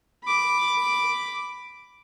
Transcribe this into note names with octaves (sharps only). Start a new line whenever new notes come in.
B5 D6